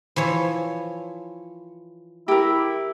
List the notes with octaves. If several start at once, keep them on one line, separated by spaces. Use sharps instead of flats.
E3 F3 C#5
E4 G4 A#4